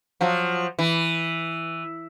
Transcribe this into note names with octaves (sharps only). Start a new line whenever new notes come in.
F3 F#3
E3